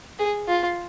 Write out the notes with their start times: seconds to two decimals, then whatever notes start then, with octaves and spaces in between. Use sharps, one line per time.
0.19 G#4
0.48 F4